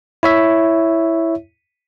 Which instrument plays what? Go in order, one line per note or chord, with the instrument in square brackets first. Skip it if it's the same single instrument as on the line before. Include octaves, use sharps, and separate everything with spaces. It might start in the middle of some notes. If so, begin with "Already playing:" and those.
[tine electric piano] E4 C#5 E5